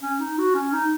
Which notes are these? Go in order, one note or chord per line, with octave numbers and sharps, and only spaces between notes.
C#4
D#4
F#4
C#4
D#4